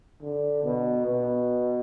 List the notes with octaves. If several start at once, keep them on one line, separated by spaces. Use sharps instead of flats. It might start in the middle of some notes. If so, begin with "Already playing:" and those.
D3
B2
B2